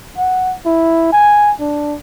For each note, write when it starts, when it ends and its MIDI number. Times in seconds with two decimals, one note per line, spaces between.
0.18 0.54 78
0.66 1.11 64
1.12 1.53 80
1.60 1.97 62